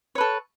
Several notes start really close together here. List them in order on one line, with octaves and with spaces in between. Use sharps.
C#5 B4 A4